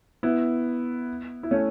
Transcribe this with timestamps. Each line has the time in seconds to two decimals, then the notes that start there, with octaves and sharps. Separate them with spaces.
0.23 B3 E4
1.43 E4
1.51 A3 C#4